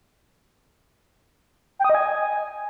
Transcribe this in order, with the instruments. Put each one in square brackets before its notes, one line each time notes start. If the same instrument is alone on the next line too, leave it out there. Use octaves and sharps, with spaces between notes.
[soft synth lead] G5
D#6
D#5
G#5